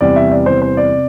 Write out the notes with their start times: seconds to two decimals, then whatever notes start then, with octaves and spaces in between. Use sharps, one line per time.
0.01 E2 C3 G3 D5
0.16 E5
0.31 D5
0.46 E2 C3 G3 C5
0.62 C5
0.77 D5
0.93 C3